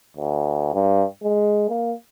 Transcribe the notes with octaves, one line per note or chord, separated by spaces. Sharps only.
D2
G2
G#3
A#3